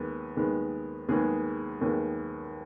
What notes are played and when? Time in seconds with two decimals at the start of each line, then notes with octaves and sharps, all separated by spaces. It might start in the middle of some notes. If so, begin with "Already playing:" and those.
Already playing: D#2 D#3 G#3 B3
0.37 D#2 D#3 G#3 B3
1.09 D#2 D#3 G#3 B3 G#4
1.81 D#2 D#3 G#3 B3